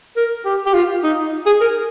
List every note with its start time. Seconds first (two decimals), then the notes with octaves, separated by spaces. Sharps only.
0.17 A#4
0.45 G4
0.66 G4
0.74 F4
1.03 D#4
1.46 G#4
1.61 A#4